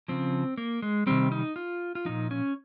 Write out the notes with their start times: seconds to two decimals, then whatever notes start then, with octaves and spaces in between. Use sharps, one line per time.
0.08 C#3 F3 C4
0.58 A#3
0.82 G#3
1.06 C3 D#3 G3 C4
1.32 D#4
1.56 F4
1.95 F4
2.05 A#2 F3 D#4
2.31 C#4